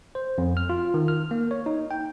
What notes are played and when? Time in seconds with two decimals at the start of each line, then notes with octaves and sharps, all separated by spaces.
0.15 C5
0.38 F2
0.57 F6
0.69 F4
0.94 D#3
1.08 F6
1.31 A#3
1.51 C#5
1.66 D#4
1.91 G5